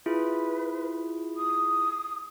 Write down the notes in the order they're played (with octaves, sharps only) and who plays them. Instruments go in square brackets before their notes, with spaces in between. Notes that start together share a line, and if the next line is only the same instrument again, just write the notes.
[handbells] E4 F4 G#4 [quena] B4
[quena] D#6